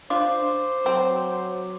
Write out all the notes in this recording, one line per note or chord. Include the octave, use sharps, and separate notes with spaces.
D4 F4 C5 D6
F#3 C4